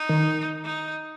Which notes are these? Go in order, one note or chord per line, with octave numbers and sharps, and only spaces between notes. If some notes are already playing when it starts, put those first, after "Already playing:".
Already playing: D#4
D#3
D#4